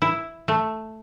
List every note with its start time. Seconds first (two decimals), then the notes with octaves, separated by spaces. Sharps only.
0.02 E4
0.48 A3